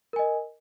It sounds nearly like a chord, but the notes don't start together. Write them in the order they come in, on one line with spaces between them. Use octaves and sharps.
A#4 G#5 D#5